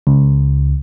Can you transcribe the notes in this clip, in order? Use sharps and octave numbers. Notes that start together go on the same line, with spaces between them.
C#2